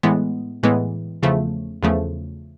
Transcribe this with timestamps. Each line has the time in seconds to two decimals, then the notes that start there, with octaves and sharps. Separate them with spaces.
0.03 A2 E3 G#3 B3
0.63 A2 E3 G#3 B3
1.23 E2 C#3 F3 A3
1.83 E2 C#3 F3 A3